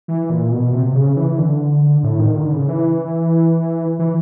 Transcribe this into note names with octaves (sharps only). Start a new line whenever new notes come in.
E3
A#2
B2
C3
C#3
E3
D3
A2
D#3
D3
C#3
E3
E3